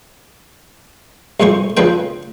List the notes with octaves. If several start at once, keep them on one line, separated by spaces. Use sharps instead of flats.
C2 F2 G#3 C5 C#6
C#3 F3 C4 B4 G5